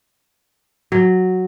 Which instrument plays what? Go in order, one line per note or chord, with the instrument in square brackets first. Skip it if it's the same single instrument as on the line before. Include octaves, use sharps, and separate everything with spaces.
[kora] F#3